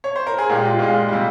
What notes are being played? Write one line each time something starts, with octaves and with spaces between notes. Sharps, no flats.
C#5
C5
A#4
G#4
A#2 G#3 G4
F4
A#2 G#3
C3 G3